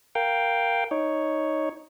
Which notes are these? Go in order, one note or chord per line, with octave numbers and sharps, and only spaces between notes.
A#4 F5 G5
D#4 C#5